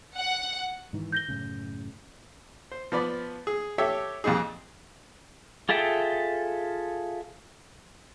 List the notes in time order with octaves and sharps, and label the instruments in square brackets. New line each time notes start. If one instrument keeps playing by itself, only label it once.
[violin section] F#5
[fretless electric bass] G#2 D#3 E3
[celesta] G6 A#6 G7
[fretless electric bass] F#2 A2 C#3
[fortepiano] C5
F3 B3 D5 B5
G#4
G4 A4 C#5 E5
F2 A#2 G3 D#4 G#4
[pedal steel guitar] F4 G#4 A4 E5 G5